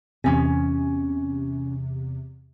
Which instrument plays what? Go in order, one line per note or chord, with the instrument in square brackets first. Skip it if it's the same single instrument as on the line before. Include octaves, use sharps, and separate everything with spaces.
[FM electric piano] E2 C3 [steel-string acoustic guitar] C#4 G#5